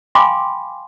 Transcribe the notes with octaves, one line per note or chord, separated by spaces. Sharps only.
F5 G5 G#5 B5 C6 D6